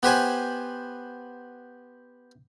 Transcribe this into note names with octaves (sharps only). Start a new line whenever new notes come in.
B3 G4 B4 C5 G#5